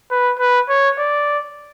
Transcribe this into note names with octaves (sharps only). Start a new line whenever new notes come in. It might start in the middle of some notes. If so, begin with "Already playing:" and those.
B4
B4
C#5
D5